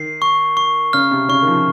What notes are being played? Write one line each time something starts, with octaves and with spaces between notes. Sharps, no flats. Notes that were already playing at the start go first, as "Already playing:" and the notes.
Already playing: D#3 C7
C#6
C#6
C#3 F6
C3
C#3 C#6
D#3
F3